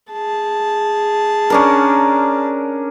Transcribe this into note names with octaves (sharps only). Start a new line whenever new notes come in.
G#4 A5
C#4 D4 A#4